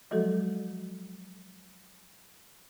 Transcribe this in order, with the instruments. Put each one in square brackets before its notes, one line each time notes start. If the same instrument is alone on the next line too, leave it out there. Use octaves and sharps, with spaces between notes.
[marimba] F3 F#3 G#3 F#4 A4